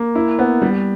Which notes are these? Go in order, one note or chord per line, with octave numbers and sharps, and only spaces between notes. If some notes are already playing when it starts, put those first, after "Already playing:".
Already playing: A#3
E4
B3
G3